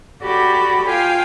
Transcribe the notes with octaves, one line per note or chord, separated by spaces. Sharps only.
F#4 G4 A4 D5 B5
F4 F5 G5 G#5